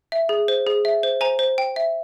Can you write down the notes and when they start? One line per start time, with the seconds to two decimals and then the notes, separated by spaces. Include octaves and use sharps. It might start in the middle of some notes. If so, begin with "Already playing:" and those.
0.12 E5
0.29 G#4
0.48 C5
0.67 G#4
0.85 E5
1.03 C5
1.21 C5 G#5 A#5
1.39 C5
1.58 G5
1.76 E5